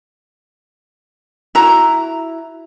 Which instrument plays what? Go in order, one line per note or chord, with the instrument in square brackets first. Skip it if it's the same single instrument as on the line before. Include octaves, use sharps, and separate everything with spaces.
[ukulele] E4 F#4 A#5